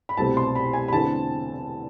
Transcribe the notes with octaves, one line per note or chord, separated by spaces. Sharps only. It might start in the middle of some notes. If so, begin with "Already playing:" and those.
B5
C2 B2 A3 C4 A5
C6
B5
G#5
B5
E2 D3 A3 C4 A5